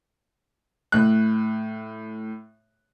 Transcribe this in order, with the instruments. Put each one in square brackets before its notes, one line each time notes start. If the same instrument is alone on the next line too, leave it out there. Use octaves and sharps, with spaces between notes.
[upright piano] A2 F#6